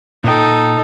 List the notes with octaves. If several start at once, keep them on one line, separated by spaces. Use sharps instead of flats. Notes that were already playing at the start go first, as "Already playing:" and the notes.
A#2 D#4 A4 G5